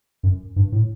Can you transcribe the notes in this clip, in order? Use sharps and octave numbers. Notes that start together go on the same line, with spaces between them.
F#2
G2
A2